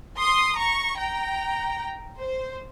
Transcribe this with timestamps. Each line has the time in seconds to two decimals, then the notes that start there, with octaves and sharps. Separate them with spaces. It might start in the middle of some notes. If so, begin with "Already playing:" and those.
0.17 C6 D#6
0.57 A#5 C#6
0.97 G5 A#5
2.18 C5